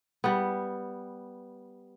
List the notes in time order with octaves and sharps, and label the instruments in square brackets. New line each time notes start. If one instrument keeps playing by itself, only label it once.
[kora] G3 B3